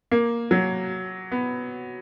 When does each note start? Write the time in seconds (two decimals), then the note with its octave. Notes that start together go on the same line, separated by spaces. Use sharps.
0.12 A#3
0.51 F#3
1.32 B3